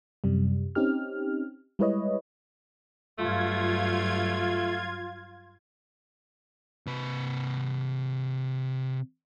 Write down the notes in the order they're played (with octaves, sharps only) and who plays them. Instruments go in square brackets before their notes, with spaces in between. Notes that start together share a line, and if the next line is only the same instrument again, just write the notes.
[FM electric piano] F#2 C3 G3
C4 C#4 D#4 G4 F6
G3 G#3 E4 B4 C#5 D#5
[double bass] G2 F#3 [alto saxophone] A3 [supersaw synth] F4 G#6
[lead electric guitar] C3 B4